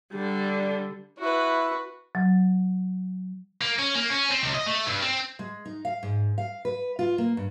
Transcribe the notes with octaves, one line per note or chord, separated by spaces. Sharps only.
D3 G3
E4 F#4 B4
F#3
A#3
C#4
A#3
C#4
C4
C#2
D#5
A3
G2
C4
G#3
D#4
F5
G#2
F5
B4
F4
A#3
G2